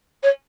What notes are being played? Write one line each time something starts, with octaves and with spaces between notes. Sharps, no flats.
C#5